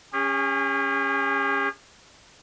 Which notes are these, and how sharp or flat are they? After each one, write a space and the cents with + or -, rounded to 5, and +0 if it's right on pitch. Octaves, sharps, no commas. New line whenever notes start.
C#4 +0 G#4 -45